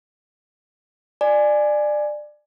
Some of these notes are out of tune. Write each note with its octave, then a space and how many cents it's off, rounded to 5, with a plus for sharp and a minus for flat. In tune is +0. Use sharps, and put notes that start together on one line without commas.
D5 +20 G#5 +0